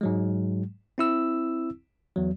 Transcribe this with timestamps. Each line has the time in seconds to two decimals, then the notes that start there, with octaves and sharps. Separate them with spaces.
0.01 G#2 F#3 G#3
0.98 C4 E4 E6
2.16 E2 F#3